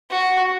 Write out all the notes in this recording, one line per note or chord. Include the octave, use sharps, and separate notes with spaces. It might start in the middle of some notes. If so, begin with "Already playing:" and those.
F#4